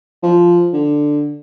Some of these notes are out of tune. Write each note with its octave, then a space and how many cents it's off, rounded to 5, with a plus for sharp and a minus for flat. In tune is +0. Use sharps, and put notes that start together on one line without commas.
F3 -5
D3 +5